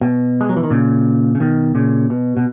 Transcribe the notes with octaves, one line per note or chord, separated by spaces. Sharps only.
B2
G#3
F#3
E3
D#3
A#2 C#3
C#3
B2 D#3
A#2 C#3
B2
B2